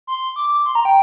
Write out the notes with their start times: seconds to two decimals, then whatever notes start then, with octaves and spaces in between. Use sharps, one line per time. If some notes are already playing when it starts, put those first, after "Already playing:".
0.07 C6
0.36 D6
0.66 C6
0.75 A#5
0.85 G5